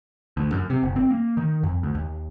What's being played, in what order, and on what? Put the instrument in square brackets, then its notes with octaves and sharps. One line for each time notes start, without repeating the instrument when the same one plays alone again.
[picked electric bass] D2
F#2
C3
F#1
C4
A#3
D#3
F2
D2
D#2